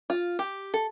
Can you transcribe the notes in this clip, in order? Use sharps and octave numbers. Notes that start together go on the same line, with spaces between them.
F4
G4
A4